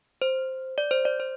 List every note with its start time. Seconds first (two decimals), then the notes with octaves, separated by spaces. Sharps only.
0.22 C5
0.78 D5
0.91 C5
1.05 D5
1.20 C5